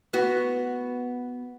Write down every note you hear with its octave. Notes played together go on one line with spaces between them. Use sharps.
B3 F#4